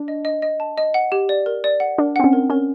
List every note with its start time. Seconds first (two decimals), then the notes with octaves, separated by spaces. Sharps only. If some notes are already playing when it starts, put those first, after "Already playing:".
Already playing: D4
0.08 D#5
0.25 D#5
0.42 D#5
0.60 A5
0.78 D#5
0.94 F#5
1.12 G4
1.29 D5
1.46 A#4
1.64 D5
1.80 F#5
1.98 D4 A#4
2.16 C4 F#5
2.24 C#4
2.33 A#4
2.50 C#4 A#4